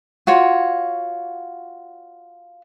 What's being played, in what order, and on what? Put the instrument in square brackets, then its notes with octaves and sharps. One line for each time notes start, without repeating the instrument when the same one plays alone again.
[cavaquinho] F4 F#4 C#5